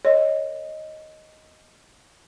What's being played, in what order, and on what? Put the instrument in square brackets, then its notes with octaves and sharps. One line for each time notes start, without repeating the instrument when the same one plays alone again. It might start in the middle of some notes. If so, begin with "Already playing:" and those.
[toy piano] A#4 D#5 [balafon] C#5